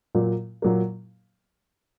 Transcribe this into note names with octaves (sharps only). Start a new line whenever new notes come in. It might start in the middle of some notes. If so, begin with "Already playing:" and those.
A#2 F#3 A#3
A#2 F#3 A#3